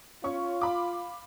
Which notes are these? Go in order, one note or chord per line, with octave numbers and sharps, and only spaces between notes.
C#4 F4 C#6
F5 B5 D6